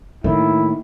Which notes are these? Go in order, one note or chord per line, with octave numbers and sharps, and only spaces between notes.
A2 D#3 A#3 E4